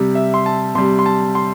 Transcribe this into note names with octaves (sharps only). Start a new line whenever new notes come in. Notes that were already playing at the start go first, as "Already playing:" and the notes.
Already playing: C3 G3
E5
C6
A5
C3 G3 C6
C6
A5
C6